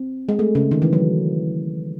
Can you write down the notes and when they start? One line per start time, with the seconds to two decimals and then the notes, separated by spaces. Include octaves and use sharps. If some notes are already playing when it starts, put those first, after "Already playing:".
Already playing: C4
0.29 G#3
0.39 A3
0.55 C#3
0.71 D#3
0.82 E3
0.93 F#3